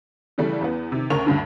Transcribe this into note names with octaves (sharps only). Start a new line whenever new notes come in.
C#3 E3 G3 A3
E2 B3
C3 D#3
D2 C#4 A#4 C#6 F7
D2 G2 D3